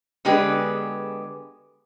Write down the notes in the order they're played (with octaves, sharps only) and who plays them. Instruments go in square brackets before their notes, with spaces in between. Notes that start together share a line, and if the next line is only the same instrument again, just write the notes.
[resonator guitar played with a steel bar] D3 G#3 B3 G4 G#4 B4